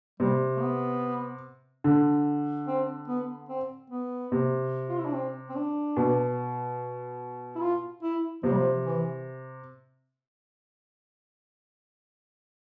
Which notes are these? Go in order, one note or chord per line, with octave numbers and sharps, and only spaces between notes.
C3 G3
A3
B3
D3
C4
B3
C4
B3
C3
F4
E4
D4
C4
C4
D4
B2
E4
F4
E4
C3 F3
G3
F3
E3